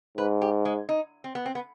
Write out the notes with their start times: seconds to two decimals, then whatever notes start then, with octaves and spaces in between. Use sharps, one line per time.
0.17 G#2 B4
0.42 G4
0.65 G#3
0.89 D#4
1.24 C4
1.35 B3
1.46 C4
1.55 B3